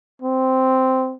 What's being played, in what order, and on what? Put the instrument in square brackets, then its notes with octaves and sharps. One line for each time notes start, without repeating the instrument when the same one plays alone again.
[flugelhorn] C4